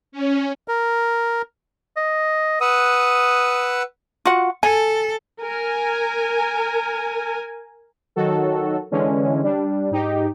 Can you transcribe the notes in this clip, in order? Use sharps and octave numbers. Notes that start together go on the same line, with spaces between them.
C#4
A#4
D#5
B4 F#5 D#6 E6
F4 F#4 F#5
A4 G#5
A#4 G#5
D#3 F#3 F#4 A4
D3 E3 G#3 C#4
G3 D4
G#2 D#4 G4